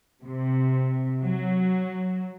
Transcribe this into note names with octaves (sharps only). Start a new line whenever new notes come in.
C3
F#3